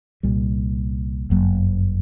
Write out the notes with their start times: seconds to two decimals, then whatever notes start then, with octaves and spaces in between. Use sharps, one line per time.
0.23 C2 A#2 G3
1.30 G1 F#2 F#3 A#3